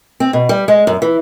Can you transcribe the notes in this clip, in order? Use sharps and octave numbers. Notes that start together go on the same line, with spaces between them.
C4
B2
G3
G#3
F#2
E3